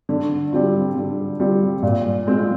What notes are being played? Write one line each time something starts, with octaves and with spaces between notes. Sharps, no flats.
D3
G3 C4 F4
D3
G3 C4 F4
A#2
G#3 C4 F4